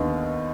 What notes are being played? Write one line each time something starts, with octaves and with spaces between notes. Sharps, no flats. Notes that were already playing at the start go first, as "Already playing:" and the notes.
Already playing: D#2 D3 B3 D#4